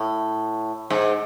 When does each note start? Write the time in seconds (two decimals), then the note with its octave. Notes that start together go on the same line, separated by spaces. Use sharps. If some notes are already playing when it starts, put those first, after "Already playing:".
Already playing: A2
0.90 G#2